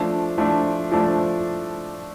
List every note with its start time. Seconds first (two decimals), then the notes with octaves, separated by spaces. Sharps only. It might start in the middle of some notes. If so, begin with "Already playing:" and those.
Already playing: F3 A3 D4
0.38 F3 A3 D4
0.92 F3 A3 D4